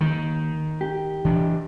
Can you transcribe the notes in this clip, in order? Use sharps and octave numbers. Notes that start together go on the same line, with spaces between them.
D#2 D#3
G4
E3 D4